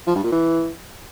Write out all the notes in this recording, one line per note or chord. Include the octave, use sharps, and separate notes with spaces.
F3
G2
A#2
E3